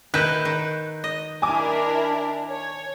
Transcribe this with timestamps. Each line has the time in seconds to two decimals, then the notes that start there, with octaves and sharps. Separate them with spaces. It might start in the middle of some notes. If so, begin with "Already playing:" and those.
0.14 D#3 E4 B4 F#6 G6
0.45 D#3
1.04 D#5
1.42 D4 E4 A#4 G#5 A5 D6
2.49 C#5